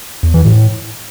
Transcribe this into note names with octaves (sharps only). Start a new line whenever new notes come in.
E2
E3
A2